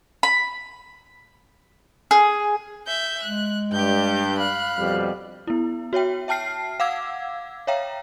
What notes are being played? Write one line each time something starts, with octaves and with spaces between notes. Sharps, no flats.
B5
G#4
E5 G6
G#3 F#6
G2 G4 G6
F5 B5 F#6
F2 B2 G3
B3 E4
F#4 C#5 E5 G5
E5 G5 A5 F6 C7
F5 F#5 D6 E6 G#6
C#5 E5 F5 G5 A#5